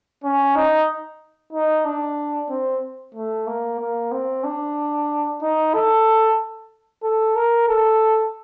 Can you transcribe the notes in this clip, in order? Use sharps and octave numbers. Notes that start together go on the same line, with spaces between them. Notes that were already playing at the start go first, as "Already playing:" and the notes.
C#4
D#4
D#4
D4
C4
A3
A#3
A#3
C4
D4
D#4
A4
A4
A#4
A4